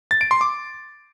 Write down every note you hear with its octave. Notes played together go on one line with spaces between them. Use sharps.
A6
D7
C6
D6